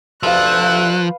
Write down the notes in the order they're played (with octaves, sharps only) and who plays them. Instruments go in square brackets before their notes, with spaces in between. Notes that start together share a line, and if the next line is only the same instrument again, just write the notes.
[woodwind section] D2 C3 E6 [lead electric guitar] F3 [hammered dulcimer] B4 F5 [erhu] F#6